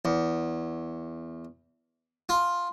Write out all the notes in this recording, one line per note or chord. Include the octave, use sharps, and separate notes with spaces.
E2
F4